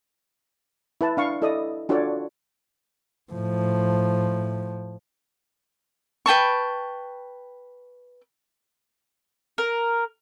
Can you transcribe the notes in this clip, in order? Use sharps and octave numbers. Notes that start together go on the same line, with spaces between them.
E4 B4 A5
D4 F5 C#6
E4 A4 D5 D#5 D#6
D4 F4 F#4 A4 C#5 D5
A2 F3
B4 G5 A5 C#6
A#4